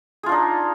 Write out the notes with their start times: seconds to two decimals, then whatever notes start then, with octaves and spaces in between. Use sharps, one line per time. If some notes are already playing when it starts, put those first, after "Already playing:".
0.23 G#4
0.26 F4
0.29 D4
0.32 D#4